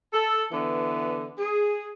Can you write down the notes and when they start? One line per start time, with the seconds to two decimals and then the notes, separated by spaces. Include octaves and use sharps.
0.13 A4
0.51 D3 E3 B3
1.38 G#4